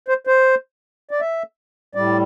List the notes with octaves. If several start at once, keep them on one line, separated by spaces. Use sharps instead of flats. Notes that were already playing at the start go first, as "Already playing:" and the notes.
C5
C5
D5
E5
A2 G3 D5